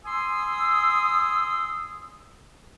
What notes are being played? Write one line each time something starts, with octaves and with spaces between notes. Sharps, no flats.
G#5 C6 D#6 E6